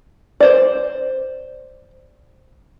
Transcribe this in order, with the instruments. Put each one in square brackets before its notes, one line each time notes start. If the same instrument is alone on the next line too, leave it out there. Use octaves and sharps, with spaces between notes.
[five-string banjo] C5 D5